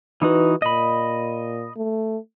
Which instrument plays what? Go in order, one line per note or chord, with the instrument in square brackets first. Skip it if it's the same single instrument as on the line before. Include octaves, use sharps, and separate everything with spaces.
[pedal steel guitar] E3 D#4 F#4 [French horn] B4
[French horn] A#2 [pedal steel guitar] D#5 B5
[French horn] A3